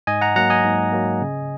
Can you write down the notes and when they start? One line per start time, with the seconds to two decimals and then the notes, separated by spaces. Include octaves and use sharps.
0.07 G#2 D#5 G#5
0.21 F#5 A#5
0.36 F#3 A#3 F#5 A#5
0.50 D#5 G#5
0.64 G#2
0.93 F#3 A#3
1.22 C#3